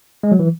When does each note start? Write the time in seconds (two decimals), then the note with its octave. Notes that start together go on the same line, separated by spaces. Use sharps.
0.23 G#3
0.32 F#3
0.39 E3